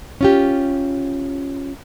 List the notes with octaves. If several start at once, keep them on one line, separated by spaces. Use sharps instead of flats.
C#4 F4 G4